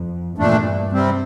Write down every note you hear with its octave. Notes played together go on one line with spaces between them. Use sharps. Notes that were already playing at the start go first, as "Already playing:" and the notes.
Already playing: F2
E2 G2 A#2 A3 D4
C3 G3 C4